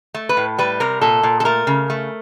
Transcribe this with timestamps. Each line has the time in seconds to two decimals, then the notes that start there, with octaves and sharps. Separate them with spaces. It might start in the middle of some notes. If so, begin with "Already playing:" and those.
0.14 A3
0.29 B4
0.37 A2
0.58 G3 B4
0.80 C3 A#4
1.01 A#2 A4
1.23 A#2
1.40 A4
1.45 A3 A#4
1.67 C#3
1.90 A3